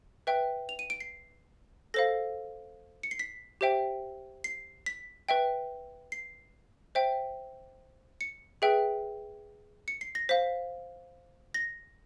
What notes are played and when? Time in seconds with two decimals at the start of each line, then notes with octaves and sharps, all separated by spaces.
0.27 B4 E5 G5
0.69 F7
0.79 D#7
0.90 D7
1.00 C7
1.94 A4 C5 F5 A#6
3.03 C#7
3.11 C7
3.19 B6
3.61 G4 C5 E5 G5
4.44 C7
4.86 B6
5.29 B4 E5 G5
6.12 C7
6.95 C5 E5 G5
8.21 C#7
8.62 G#4 B4 E5 G5
9.88 C#7
10.01 C7
10.15 A#6
10.29 C5 F5 B6
11.54 A#6